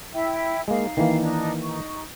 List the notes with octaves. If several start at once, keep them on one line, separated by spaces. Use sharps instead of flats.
E4 E5 G5
G#3 A#3 D#4 F5
D#3 E3 A#3
D4 D#4
D#4 C#6